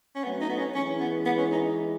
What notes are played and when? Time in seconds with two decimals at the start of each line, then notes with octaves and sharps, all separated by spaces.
0.15 C#4
0.24 F#3 A3 B3
0.41 D#4
0.50 B3
0.59 C#4
0.75 E3 G#3 C#4
1.00 B3
1.26 B3
1.38 C#4
1.52 D#4